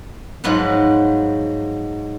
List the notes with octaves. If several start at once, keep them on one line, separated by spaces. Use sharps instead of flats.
G#2 F3 F#3 B4 F#5